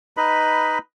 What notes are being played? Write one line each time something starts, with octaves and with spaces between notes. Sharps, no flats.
D#4 B4 D#5 B5